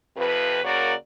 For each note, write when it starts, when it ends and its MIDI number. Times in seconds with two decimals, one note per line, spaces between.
0.17 0.63 41
0.17 0.63 48
0.17 0.63 53
0.17 0.63 71
0.64 0.95 49
0.64 0.95 58
0.64 0.95 66
0.64 0.95 70
0.64 0.95 73
0.64 0.95 74